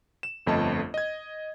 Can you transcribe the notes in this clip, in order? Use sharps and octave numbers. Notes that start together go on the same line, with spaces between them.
E7
G1 F2 A3 D#5 A5
D#5 G#6